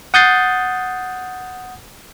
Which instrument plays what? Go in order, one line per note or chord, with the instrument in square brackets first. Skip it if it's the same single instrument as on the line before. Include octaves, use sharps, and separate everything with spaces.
[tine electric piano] F#5 D#6 G6 A6 C7